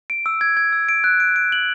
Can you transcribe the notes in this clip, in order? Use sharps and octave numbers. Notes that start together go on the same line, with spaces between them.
D7
E6
G#6
G#6
E6
D7
F#6
D7
D7
F#7